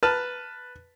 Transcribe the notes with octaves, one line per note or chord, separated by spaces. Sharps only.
B4 A5 F6